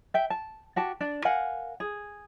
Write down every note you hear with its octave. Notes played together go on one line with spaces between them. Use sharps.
E5 G5
A5
F#4 G4 A5
D4
A#4 F5 F#5 G#5
G#4